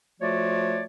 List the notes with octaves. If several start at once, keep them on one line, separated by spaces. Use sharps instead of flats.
F3 A3 F4 F#4 C#5 D5